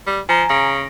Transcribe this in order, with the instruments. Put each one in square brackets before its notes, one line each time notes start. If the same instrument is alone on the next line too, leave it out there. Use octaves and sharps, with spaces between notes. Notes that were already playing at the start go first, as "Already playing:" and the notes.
[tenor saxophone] G3
[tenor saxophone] F3 [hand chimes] G#5 A#5
[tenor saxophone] C#3 [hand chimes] A#6 D7